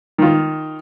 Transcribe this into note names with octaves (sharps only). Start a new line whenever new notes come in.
D#3 F4